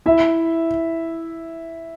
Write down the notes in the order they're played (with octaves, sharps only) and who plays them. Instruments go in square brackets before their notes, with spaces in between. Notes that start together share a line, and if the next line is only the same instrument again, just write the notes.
[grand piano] E4 E5